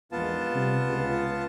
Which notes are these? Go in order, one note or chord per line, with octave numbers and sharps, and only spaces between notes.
A#1 E2 G#2 B3 F4 A5
C3 G3
C#2